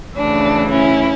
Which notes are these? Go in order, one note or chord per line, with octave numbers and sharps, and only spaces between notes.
D2 C#3 E3 D4
C#4 E4